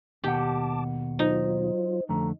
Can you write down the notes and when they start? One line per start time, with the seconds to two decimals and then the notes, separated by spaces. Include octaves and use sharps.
0.24 D#2 B2 G4 F#5 A5 D6
1.19 F#3 D#4 F4 C5
2.09 F2 D3 A3 A#5